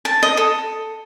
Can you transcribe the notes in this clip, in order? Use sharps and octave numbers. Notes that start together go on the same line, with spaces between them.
A5
D#5
A4